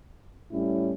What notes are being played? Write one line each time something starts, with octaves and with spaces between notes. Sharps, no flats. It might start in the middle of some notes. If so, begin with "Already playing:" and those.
A2 G3 C#4 E4